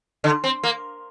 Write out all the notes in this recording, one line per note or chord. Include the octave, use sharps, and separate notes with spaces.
D3
C4
A#3